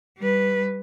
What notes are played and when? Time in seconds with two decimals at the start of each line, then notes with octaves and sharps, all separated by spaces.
0.18 G3 B4